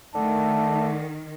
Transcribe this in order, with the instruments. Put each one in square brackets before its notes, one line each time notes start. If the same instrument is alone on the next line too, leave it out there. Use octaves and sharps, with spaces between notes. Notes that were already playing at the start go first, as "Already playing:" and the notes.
[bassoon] D3 [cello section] D#3 [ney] A3 [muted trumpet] A5